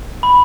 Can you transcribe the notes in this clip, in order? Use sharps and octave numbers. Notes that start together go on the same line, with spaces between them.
B5